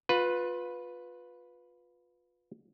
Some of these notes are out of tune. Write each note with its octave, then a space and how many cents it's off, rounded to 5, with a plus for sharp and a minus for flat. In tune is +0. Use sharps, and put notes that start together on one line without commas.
F4 +25 B4 +0